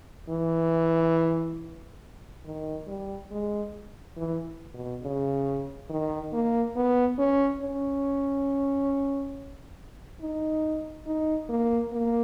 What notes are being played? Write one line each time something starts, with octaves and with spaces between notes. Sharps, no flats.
E3
D#3
G3
G#3
E3
B2
C#3
D#3
A#3
B3
C#4
C#4
D#4
D#4
A#3
A#3